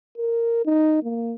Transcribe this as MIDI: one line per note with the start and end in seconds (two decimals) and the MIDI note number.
0.18 0.62 70
0.65 1.01 63
1.03 1.35 58